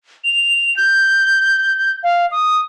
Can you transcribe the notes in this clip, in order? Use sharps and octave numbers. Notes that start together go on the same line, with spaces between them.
F7
G6
F5
D#6